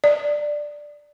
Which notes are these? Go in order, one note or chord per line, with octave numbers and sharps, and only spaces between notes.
D5